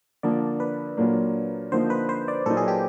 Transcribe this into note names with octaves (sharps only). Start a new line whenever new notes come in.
D3 F3 A#3 D5
B4
A#2 F#3 A#3 D4
D3 F3 A#3 D#4 C5
B4
C5
D5
A#2 F#3 A#3 D#4 A4
G#4
G4